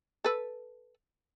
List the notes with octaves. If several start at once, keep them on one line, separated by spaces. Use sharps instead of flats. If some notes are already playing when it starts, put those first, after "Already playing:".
A4 B4